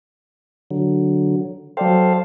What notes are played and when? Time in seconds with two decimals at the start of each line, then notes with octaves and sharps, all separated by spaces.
0.71 D3 F#3
1.77 F#3 A4 C5 D5 F5 G5